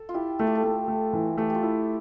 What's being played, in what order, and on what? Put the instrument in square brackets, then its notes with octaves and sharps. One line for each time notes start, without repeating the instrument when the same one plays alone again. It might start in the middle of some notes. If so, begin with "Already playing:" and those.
Already playing: [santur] A4
F4
[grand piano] E4 [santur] G4
[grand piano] A3 [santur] A4
[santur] G4
A4
[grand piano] A3
A3
E3
[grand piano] A3 [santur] G4
[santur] F4 G4
[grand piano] E4